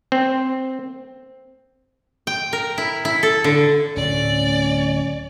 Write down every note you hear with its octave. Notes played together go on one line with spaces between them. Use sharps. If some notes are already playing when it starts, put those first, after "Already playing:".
C4
G5
A#4
E4
E4
A4
D3
D1 A2 C#4 D5